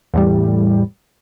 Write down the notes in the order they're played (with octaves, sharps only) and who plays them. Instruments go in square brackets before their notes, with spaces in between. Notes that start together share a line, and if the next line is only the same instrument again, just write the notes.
[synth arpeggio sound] E2 A2 G3